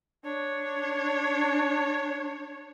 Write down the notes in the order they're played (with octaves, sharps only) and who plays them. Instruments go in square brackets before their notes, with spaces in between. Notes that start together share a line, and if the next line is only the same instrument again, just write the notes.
[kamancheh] D4 C#5